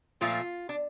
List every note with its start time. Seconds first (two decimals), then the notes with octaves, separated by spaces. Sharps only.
0.21 A#2 F3 A3 F4
0.69 D4